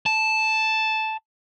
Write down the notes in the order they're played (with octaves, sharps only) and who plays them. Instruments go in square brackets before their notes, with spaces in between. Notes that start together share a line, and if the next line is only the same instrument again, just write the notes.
[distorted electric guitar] A5